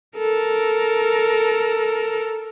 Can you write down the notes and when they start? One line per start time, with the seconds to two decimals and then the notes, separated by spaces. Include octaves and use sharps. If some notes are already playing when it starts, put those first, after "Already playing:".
0.17 A4 A#4